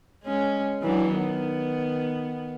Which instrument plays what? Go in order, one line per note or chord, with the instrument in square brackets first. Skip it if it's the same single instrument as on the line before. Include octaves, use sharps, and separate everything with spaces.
[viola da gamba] G#3 C#4
E3 F#3 D4
D#3 B3